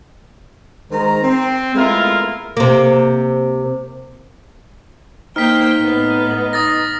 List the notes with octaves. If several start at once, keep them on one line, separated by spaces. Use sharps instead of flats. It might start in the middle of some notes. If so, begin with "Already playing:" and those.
D#3 G#3 C5 A#5
C4
G#3 A3 B3 E4 F4 A#4
C3 A#3
A#3 D#4 C5 G5 F6 B6
A2 B3
D#6 A6 A#6